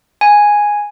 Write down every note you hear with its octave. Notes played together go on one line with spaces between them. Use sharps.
G#5